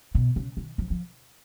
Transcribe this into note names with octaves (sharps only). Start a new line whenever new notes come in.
B2
C#3
D#3
F3
F3